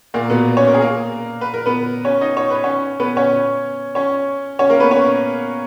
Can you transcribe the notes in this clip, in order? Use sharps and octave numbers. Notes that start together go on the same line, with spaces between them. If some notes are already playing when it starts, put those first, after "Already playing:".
A#2 A#3
B2 B3
C#4 C#5
A#4
G#4
A#3 A#4
B4
A#4
B3 B4
C#4 C#5
D#4 D#5
C#5
B4
C#4 C#5
B3 B4
C#4 C#5
C#4 C#5
C#4 C#5
A#3 A#4
B3 B4
C#4 C#5